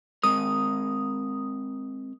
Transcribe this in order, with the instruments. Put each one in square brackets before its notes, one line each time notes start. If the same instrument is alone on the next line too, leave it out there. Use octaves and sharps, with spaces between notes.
[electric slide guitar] G#3 C4 A#4 [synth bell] D#6